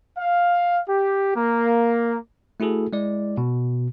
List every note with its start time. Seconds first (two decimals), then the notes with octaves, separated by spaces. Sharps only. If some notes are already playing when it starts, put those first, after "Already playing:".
0.18 F5
0.89 G4
1.35 A#3
2.60 A3 E4 F#4 G#4 A4
2.93 G#3 E4 D5
3.37 B2